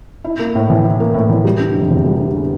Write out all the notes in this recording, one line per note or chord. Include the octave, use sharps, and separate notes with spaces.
E4
A#3
A2
E3
E4
A#3
A2
E3
G3
D3
F1
E2
G3
D3